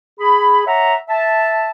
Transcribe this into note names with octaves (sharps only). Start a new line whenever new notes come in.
G#4 B5
C#5 E5 F#5 A#5
E5 A5